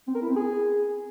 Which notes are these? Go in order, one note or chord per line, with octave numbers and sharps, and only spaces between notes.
C4
A#4
E4
C4
G#4